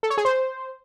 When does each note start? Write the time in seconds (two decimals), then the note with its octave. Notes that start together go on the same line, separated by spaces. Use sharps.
0.03 A4
0.10 C#5
0.18 G#4
0.25 C5